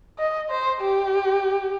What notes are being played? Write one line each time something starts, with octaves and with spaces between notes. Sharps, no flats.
D#5
C5
G4